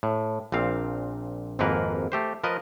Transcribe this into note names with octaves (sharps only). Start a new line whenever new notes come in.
A2
A#1 A#2 C4 F5
G#1 F2 G#2 A#3 A#4 B4
A3 G4 C5
F3 A#4 B4 D#5